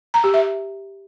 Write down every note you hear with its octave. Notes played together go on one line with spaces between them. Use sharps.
A#5
G4
E5